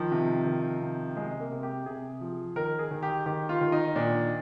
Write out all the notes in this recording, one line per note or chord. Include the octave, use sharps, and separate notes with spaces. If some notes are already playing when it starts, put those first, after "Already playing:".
Already playing: D#3 F3
C3
D#3
C3
C3 G#3
A#3
C3
G4
C3 G#4
F3
D#3 A#4
G#4
D#3
G4
D#3 G4
F4
D#3
D#4
A#2 D4